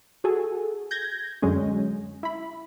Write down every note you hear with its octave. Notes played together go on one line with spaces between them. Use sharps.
F#4 G#4 A4
G6 G#6 A#6
F#2 D3 F#3 G#3 C#4
E4 B5